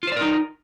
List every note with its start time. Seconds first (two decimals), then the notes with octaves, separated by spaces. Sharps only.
0.03 F4
0.07 C5
0.12 D5
0.17 A#4
0.21 D#4